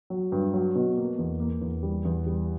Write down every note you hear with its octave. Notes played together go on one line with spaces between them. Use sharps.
F#3
G2
F#3
B2
A#3
E2
A#3
E2
G3
E2
G3